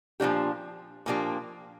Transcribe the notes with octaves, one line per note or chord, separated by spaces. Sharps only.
A#2 F3 A#3 D4 G4
A#2 F3 A#3 D4 G4